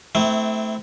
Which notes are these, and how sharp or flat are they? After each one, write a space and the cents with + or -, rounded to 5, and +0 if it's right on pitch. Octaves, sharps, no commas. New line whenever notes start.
A3 +0 C4 -25 E4 -20